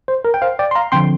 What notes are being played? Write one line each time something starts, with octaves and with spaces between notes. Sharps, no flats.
C5
A#4
G5
C5 F5
D5 G5
C6
F5 A#5
D3 F3 C4 G5 C6